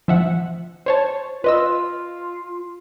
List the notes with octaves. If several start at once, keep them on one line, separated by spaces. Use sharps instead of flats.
F3 E5 F#5
C5 C#5 A5
F4 B4 D#5 E6